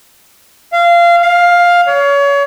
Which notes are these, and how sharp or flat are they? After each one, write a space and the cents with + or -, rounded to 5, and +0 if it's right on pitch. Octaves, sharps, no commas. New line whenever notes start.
F5 -20
F5 +10
C#5 +30